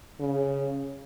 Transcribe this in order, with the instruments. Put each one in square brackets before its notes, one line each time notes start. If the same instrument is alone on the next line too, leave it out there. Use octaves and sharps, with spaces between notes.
[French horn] C#3